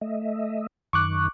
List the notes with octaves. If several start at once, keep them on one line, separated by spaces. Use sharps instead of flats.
A3 D#5 E5
F#2 D#3 C#6 D6 F#6